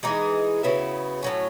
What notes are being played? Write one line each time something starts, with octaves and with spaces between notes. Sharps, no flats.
E3 G#3 D#4 G#4
C#3 F#3 B3 E4
A2 F#3 C#4